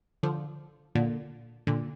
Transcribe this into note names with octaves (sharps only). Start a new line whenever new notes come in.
D3 F3
A#2 D3
A#2 D3